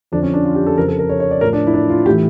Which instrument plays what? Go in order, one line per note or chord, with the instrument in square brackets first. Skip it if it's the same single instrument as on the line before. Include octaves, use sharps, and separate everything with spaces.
[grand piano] F2 D3 F3 D4
C#4
D4
F4
G4
A4
F2 C#3 F3 A#4
A4
A#4
C#5
C#5
D5
A2 F3 A#4
D4
E4
D4
F4
A2 E3 G4